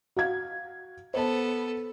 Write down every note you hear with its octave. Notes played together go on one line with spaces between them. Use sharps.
F#4 F5 G#6
B3 A4 C5 A5